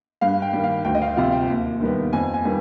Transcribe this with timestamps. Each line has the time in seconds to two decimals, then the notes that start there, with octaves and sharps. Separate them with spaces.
0.21 G2 F5
0.42 G5
0.53 D#3 G3
0.64 F5
0.85 D2 G5
0.95 D#5
1.02 F5
1.17 C3 F3 F5
1.32 G5
1.48 D#2
1.81 D#3 G3 B3
2.13 F2 G#5
2.34 G#5
2.45 D#3 G3 B3